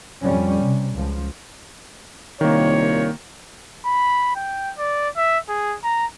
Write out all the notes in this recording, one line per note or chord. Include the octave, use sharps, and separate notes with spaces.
F2 G3 C#4
C3
C#2 F3
C2 A#2 D#3 A#3 C#5
B5
G5
D5
E5
G#4
A#5